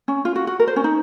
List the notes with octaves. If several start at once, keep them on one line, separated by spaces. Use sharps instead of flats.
C#4
F4
F#4
F#4
A#4
C5
C#4
D#4